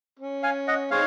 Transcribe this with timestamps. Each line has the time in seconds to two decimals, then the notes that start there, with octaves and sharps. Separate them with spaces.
0.19 C#4
0.43 F5 G#5
0.68 D#5 F#5
0.91 G#3 C4 D#4 C#5 F5